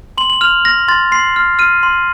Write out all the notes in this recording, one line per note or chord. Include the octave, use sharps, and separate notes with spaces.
C6 F#7
F#7
F6 F7
F6 A#6
C6 A6
C6 C7
F6
F6 D#7
C6